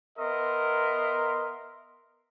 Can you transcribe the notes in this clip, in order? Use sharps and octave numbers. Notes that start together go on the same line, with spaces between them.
B3 A#4 D#5 E5 C6